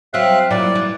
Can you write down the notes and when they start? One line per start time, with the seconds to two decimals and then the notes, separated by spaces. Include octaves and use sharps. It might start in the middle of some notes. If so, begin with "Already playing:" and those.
0.14 F#3 C4 E5 F5 F#6
0.50 A#2 F#3 E4 D5
0.75 E3